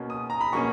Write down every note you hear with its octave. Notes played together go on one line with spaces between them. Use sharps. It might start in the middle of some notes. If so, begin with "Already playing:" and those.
Already playing: B2 A#3 C#4
D#6
A#5
B5
B2 A#3 C#4 C#6